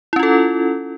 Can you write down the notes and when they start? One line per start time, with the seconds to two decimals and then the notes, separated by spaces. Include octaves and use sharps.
0.13 E4
0.16 C#4
0.19 F4
0.23 A4